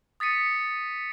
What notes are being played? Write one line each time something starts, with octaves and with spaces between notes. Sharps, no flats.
D#6 A6 B6 C#7 D#7